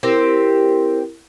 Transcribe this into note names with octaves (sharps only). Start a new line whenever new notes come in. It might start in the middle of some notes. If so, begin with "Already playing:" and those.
C4 E4 G4 A#4 C5